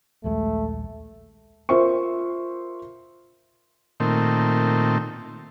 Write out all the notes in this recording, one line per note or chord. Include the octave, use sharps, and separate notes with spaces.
A#1 D#2 G#3 A3
F4 A#4 C5 E5 C#6
A#2 D#3 A3 C4